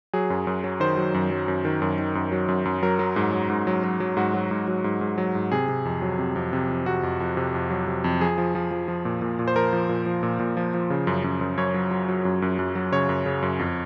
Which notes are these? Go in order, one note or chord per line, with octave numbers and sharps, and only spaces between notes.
F#3 G#4
F#2
F#2
F#3
D#3 C5
F#3
F#2
F#3
F#2
D#3
F#2
D#3
F#2
F#3
F#2
F#2
F#3 A#4
F#3
G#2
F#3
G#2
F#3
F#3
F#3
G#2 F#4
F#3
G#2
F#3
G#2
G#2
F#3
G#2
C3 G#4
C3
F2
F#3
C3
F2
C3
F2
C3 F#4
F2
F2
C3
F2
F#3
C3
F2
F3 G#4
F3
F3
F3
F3
A#2
A#2
A#2
C5
F3 A#4
F3
A#2
F3
A#2
A#2
F3
F3
C#3
F#2
F#2
F#2
F#2 C#5
F#3
F#3
F#3
F#2
F#2
F#2
F#3
C#3 C#5
F#2
C#3
F#2
F2